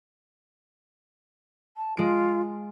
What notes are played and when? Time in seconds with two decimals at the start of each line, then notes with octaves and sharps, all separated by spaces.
1.77 A5
1.97 G#3 F4 D7